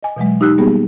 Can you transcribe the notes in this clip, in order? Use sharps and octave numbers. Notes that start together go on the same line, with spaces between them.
D#5 G#5
B2 E3 F#3 G#3
D#4 G4 E6 F#6
G3 A#3 B3 G4 G#4